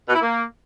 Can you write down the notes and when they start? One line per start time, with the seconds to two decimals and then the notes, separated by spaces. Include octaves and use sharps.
0.08 B2
0.14 E4
0.21 A#3